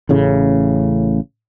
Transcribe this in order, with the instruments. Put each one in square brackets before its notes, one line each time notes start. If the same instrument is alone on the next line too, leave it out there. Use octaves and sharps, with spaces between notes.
[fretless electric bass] A1 A2 C#3